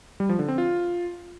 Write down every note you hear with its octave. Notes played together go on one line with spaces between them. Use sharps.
G3
F3
D3
C4
F4